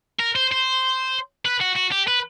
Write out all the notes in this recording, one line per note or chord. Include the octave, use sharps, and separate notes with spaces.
A#4
C5
C5
B4
F#4
F#4
G4
B4